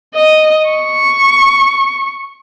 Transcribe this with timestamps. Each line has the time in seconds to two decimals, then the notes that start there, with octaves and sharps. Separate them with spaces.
0.15 D#5
0.69 C#6